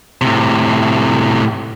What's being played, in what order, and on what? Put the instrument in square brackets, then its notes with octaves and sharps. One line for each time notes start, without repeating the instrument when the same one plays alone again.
[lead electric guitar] A2 C3